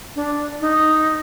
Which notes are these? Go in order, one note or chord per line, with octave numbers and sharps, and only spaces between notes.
D4
D#4